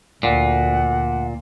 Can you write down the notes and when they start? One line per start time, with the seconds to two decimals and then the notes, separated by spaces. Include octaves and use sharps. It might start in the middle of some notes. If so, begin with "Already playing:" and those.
0.23 D2 A#2 F#5